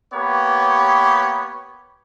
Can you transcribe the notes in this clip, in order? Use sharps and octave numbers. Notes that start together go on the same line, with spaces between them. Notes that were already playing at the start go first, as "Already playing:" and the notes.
A#3 B3 G4 B4 C#5